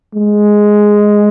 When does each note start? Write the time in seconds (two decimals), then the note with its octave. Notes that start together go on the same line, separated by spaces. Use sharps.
0.14 G#3